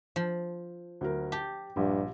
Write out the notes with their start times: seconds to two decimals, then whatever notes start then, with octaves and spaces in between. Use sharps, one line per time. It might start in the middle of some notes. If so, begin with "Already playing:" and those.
0.16 F3
1.01 D2 F#3 A#4
1.32 G4 A5
1.77 A#1 G2